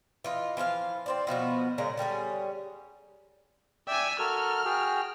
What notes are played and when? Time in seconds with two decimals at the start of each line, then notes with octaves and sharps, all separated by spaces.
0.24 E3 F4 D#5
0.57 E3 F3 C#5 F5
1.06 C4 C5 D5
1.27 B2 F3 B3 F#4
1.78 A#2 C#3 G#3 A#5
1.97 D3 G3 C#4 G#4
3.87 D5 E5 G5 G#5
4.19 F#4 A4 A#4 F6
4.66 F#4 G#4 G5